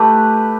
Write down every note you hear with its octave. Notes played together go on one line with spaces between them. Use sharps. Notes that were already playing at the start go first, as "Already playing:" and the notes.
Already playing: A3 G4 B4